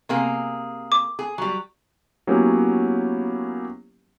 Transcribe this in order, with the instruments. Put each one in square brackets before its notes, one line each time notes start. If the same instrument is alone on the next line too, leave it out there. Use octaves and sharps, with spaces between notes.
[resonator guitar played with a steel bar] C3 A#3 G#4
[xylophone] D6
[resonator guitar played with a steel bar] G#4
F#3 G3
[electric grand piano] F#3 A#3 B3 C#4 E4 G4